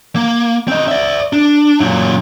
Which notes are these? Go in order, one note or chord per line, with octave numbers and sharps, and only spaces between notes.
A#3
C4 D#5
D5 E5
D4
F#2 A#2